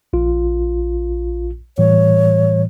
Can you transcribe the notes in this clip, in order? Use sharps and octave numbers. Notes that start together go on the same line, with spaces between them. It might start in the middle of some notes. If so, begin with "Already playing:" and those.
A#1 F4
A2 E3 G3 C#5